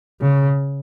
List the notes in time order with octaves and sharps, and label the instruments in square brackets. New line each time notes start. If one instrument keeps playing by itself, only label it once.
[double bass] C#3